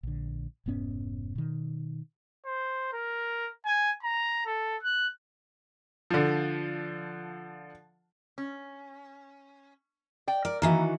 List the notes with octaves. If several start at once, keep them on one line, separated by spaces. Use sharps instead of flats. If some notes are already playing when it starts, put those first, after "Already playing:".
A#1 D3
F1 G#2 B3 C#4
B2 D#3
C5
A#4
G#5
A#5
A4
F#6
D3 F3
C#4
D5 G5
A#4 D5
D#3 E3 A#3 E4 F#4